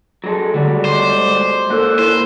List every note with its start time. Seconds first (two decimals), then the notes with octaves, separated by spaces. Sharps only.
0.24 F#3 G#3 A4
0.54 D3 G3 A3 F#4
0.85 G#3 C5 D6
1.70 G#2 A#3 A4 F#6
1.99 E4 C5